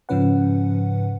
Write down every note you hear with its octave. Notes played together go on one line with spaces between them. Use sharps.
G#2 C#3 F3 C#4 B4 F#5